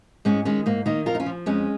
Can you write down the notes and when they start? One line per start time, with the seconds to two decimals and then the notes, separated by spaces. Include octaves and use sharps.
0.25 G#2 G#3 C#4
0.45 D#3 G#3 C#4
0.66 G#2 A#3
0.86 D#3 A#3 D#4
1.06 F2 F4 A#4
1.15 D#4
1.20 C#4 F4
1.26 F3
1.46 F2 G#3 C#4